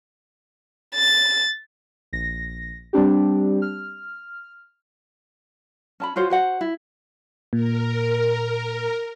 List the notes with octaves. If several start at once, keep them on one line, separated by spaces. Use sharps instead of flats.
A6
A#1 A#6
G3 C4 D4 G4
F6
C#4 A5 B5
F4 F#4 C5 C#5
F#4 C5 F#5
E4
A#2 A#4